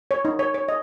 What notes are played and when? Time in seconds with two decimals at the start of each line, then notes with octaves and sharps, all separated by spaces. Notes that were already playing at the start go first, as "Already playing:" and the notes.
0.11 C#5
0.25 D#4
0.39 C#5
0.54 C#5
0.69 D#5